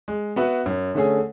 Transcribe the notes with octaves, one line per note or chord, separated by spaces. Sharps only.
G#3
B3 F#4 B4 E5
F#2
D3 A3 C#4 G#4